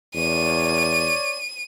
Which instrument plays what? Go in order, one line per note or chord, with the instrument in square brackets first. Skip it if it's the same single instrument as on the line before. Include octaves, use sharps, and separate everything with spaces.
[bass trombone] E2 [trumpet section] C#5 D5 [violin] D#7